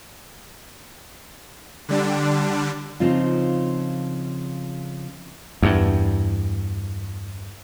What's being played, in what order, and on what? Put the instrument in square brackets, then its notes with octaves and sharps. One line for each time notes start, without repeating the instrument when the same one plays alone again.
[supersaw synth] D3 G3 D4
[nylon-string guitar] C#3 F3 C4 D#4 F4
[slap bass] E2 G2